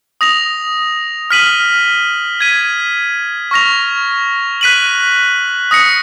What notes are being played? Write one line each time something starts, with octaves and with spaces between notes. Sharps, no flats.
D#6 A#6 F7
F6 B6 D#7 F#7
G#6 B6 D#7
C#6 F6 A#6 F7
F#6 B6 D#7 F#7
D#6 A#6 C#7